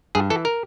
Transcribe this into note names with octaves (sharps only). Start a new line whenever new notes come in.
G2 G#4
E3 A4
A#4